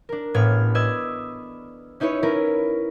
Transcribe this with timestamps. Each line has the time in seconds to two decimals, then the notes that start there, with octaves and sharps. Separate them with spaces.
0.09 D4 A#4
0.34 A1 A2 B3 F6 G#6 D7
0.75 B4 D5 D#5 E6 G#6
2.00 C#4 D#4 E4 B4 C#5
2.23 C#4 E4 A#4 B4